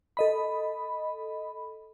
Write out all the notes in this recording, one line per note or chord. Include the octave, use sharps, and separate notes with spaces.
A4 D#5 B5